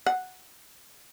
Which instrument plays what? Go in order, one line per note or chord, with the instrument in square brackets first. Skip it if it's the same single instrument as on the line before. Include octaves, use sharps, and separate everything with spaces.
[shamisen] F#5